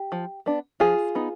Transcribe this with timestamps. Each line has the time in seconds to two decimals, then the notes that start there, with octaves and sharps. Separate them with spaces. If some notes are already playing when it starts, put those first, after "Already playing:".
Already playing: G4
0.12 F3
0.46 B3 D4
0.80 F3 F4 G#4
1.15 B3 D#4